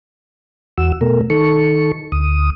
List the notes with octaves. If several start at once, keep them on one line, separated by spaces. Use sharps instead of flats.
E2 F#4 E6
B2 A3 A#4
D#3 A4 C#6
D2 D#6